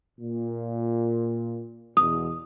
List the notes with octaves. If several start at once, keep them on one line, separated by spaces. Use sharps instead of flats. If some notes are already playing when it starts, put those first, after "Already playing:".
A#2
E2 B2 D#6